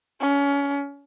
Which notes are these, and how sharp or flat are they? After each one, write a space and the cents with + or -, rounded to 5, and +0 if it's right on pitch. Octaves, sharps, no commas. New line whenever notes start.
C#4 +25